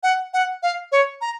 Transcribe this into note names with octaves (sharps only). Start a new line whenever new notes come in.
F#5
F#5
F5
C#5
A#5